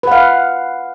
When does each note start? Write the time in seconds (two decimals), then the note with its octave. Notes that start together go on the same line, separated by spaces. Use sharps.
0.03 B4
0.07 F#5
0.12 F5